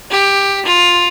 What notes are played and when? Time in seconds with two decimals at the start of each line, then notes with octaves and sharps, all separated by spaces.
0.11 G4
0.65 F4